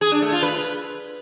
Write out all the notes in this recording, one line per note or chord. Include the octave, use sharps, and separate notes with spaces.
G#4
D4
A3
F4
B4